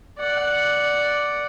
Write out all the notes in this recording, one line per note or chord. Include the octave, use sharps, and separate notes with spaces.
D5 F#5